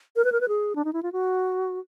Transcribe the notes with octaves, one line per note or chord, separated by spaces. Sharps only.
A#4
B4
A#4
B4
G#4
D4
D#4
E4
F4
F#4